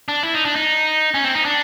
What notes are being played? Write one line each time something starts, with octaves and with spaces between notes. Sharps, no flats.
D4
E4
D#4
D4
D#4
C#4
C4
D#4
D4